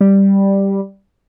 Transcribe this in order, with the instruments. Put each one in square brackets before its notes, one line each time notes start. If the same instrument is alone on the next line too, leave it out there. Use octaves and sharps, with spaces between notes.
[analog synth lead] G3